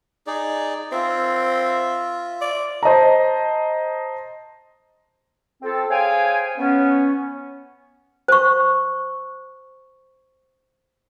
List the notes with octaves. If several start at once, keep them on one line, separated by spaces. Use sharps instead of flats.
D#4 G#4 D5
C4 F4 E5
D5
C5 D#5 A5 A#5
C4 F4 A4
G#4 C5 C#5 F5 G5 G#5
B3 C#4
C5 C#6